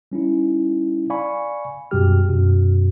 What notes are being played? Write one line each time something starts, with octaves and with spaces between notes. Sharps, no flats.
G3 C#4 D#4 E4
D5 F5 G#5 B5 C#6
F#2 B2 G3 F#4 G4 F6
F#2 B2 F#4